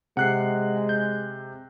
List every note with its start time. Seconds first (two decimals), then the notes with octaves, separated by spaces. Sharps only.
0.17 C3 G#3 F#5 F#6 C7
0.89 G6